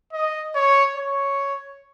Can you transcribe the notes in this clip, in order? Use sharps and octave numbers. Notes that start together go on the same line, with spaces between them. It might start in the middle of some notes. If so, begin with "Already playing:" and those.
D#5
C#5
C#5